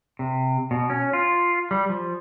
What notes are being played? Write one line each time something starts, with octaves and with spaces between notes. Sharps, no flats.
C3
B2
C#4
F4
G3
F3